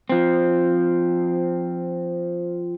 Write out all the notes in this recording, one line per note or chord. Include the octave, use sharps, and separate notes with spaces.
F3 C4